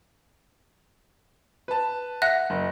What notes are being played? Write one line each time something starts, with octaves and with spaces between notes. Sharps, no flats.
B4 A5
E5 F#5 F#6 A#6
F#1